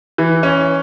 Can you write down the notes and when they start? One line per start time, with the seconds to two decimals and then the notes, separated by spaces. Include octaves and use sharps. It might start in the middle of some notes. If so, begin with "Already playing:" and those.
0.18 E3
0.43 C#4